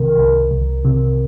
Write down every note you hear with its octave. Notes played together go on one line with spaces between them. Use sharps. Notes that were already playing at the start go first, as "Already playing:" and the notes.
Already playing: C2 C3 D#3 A#4
C2
C2
C3